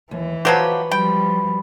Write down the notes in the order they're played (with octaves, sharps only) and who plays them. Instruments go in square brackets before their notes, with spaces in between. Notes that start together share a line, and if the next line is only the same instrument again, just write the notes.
[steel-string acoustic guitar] D#2 [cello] E3
[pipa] F3 F#3 G4 [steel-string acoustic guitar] F#4 B4
[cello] F3 G3 [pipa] G5 [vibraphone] B5